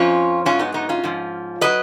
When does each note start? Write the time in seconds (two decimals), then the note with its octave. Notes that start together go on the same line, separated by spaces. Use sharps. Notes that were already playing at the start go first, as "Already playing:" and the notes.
Already playing: F2 F3 C#4 F4
0.45 G#2 F#3 C#4 F4
0.59 B3 D#4
0.74 B3 D#4
0.89 C#4 F4
1.04 G#2 F3
1.61 F#3 B4 D#5